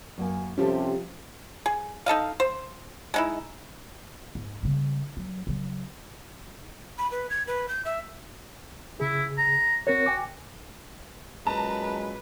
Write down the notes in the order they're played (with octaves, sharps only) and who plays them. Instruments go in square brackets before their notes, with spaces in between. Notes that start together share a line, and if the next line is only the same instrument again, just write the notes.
[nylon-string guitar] F#2 A#3 G#5
[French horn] C3 [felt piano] F3 G3 [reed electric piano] C#4 [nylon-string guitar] G4 A4
[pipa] G#4
D#4 A4 D#5 F5
C5
G#3 D#4 E4
[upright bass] G#2
C#3 G3
F#3
C#3 F#3
[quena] B5
B4
G#6
B4
G6
E5
[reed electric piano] C#3 G#4 [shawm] E4
[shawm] A#5
[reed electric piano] C4 A#4 C#5 [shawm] F#4
[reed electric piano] G5 G#5 D6
[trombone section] F#2 A#2 G#3 [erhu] B4 [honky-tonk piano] A5 A#5